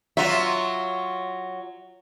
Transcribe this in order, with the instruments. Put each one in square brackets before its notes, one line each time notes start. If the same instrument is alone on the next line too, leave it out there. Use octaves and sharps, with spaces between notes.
[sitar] F#3 F4 [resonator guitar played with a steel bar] E5